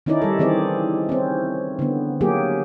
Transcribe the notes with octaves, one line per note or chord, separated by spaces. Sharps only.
D#3 C#4 D#4 E4 D5
G3 A4
D#3 E3 C4 G#4 D5
C4 C#4
D3 B3
F#3 A#3 G4 G#4